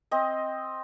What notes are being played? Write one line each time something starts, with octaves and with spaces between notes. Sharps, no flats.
C4 D#5